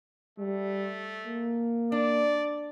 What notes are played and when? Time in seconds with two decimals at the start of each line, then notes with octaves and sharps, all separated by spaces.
0.39 G3 A3
1.27 A#3
1.92 D4 D5